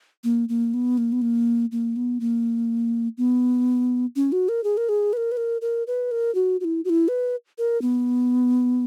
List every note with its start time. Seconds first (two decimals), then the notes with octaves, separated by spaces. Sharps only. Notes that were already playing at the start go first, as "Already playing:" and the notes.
0.24 A#3
0.49 A#3
0.74 B3
0.98 A#3
1.12 B3
1.22 A#3
1.72 A#3
1.96 B3
2.20 A#3
3.18 B3
4.16 C#4
4.32 F#4
4.49 A#4
4.64 G#4
4.77 A#4
4.89 G#4
5.13 B4
5.17 A#4
5.32 B4
5.37 A#4
5.62 A#4
5.87 B4
6.11 A#4
6.35 F#4
6.60 F#4
6.65 E4
6.85 F#4
6.90 E4
7.08 B4
7.58 A#4
7.82 B3